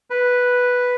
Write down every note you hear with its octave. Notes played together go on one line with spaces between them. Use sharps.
B4